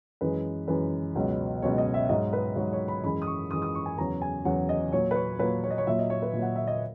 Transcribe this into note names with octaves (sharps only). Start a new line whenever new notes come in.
F#2 E3 G#3 B4
F#2 E3 G#3 B4
C#2 B2 F#3
C#2 B2 F#3 C#5
D#5
E5
G#2 F#3 D#5
B4
G#2 F#3 C#5
C#5
B5
F#2 E3 G#3 B5
D#6
C#6
F#2 E3 G#3 D#6
D#6
C#6
G#5
E2 C#3 F#3 A#5
G#5
E2 C#3 F#3 F#5
D#5
A#2 F#3 C#5
B4
C#5
A#2 F#3 B4
C#5
D#5
C#5
A#2 F#3 E5
D#5
C#5
B4
A#2
F#3 F#5
E5
D#5